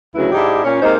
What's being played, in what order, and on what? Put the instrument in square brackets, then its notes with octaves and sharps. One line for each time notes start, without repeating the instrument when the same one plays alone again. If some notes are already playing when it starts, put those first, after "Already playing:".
[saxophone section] D2 C#3 F#3 E4 B4
G#2 D4 E4 G4 D#5
A#2 C#4
C3 G#3 A#3 D#4 C5